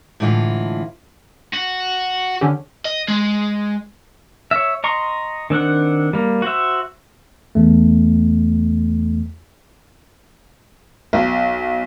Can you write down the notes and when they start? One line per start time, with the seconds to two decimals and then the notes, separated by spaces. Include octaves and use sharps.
0.20 A2 D3 E3 G#3 E4 F4
1.53 F#4
2.41 D3 C#4 G4
2.85 D#5
3.08 G#3
4.51 C#5 E5
4.84 D#5 A#5 C6 C#6
5.50 D#3 C4 D4 F#5
6.13 G3 A#3
6.42 F#4 C5 E5
7.55 E2 A3
11.13 B1